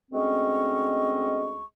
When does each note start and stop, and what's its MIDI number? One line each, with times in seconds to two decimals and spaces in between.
0.12 1.62 38
0.12 1.62 56
0.12 1.62 60
0.12 1.62 61
0.12 1.62 75
0.12 1.62 85